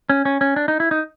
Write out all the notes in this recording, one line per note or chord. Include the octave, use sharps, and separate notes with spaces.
C#4
C#4
C#4
D4
D#4
E4
D#4